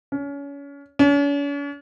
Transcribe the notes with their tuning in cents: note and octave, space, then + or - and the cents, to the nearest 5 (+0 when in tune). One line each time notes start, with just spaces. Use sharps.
C#4 +30
C#4 +45